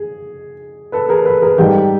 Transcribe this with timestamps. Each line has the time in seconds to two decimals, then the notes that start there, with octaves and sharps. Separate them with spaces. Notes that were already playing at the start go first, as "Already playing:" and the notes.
Already playing: G#4
0.92 A4 B4
1.09 G#4 A#4
1.25 A4 B4
1.42 G#4 A#4
1.58 G#2 D#3 G3 G4 A4